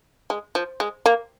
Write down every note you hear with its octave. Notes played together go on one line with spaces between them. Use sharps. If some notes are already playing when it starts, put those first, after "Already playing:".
G#3
F3
G#3
A#3